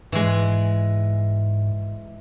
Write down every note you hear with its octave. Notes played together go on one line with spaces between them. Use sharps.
G#2 E3 G#3